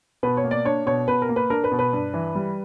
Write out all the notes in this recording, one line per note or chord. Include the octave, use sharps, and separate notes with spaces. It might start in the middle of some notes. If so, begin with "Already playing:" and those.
B2 B4
C#5
A#3
D5
D4 C#5
B2 C#5
B2 B4
A#4
A#3
B4
D4 A#4
B4
B2
B4
G2
E3
G3